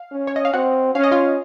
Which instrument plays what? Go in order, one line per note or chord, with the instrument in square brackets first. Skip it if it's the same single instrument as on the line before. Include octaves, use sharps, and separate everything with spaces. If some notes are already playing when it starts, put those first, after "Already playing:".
Already playing: [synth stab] F5
[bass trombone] C#4
[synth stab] C#5
D#5
F5
[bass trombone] C4 [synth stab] F#4 F#5
[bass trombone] C#4 [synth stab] F5
[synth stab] D#5
F4 F5